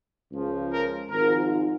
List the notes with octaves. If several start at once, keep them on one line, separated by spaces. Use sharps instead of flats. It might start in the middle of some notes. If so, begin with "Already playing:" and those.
C#2 C#3 F3
A#4
G#1 G#2 F3 A#4